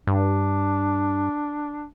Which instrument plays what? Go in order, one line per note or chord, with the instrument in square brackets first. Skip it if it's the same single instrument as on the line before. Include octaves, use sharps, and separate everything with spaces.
[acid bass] G2 [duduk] D4